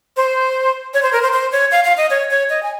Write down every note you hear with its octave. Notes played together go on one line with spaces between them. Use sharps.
C5
C#5
C5
A#4
C5
C5
C#5
F5
F5
D#5
C#5
C#5
D#5
G#5